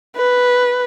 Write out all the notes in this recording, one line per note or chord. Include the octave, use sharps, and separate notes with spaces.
B4